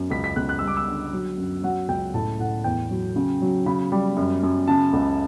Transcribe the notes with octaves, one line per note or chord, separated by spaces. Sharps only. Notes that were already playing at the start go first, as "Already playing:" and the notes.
Already playing: F#2
C#2 B6
B6
C#2 F#6
F#6
G3 E6
D6
E6
D3
F#3
F#2
F#3 F#5
C#2 G5
A2 A5
A2 F#5
E2 G5
F#3
C#3
F#3
C#3 B5
G3
F#2
F#2
C#3 A5
C#2